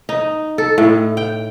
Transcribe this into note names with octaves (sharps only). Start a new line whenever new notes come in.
D#4
A4
A2
G5